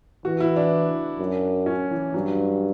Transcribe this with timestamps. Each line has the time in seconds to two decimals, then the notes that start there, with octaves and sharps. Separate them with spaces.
0.25 E3 F#4
0.40 E4
0.56 D4
1.19 F#2
1.66 C#4
1.91 E3
2.14 G2 F#3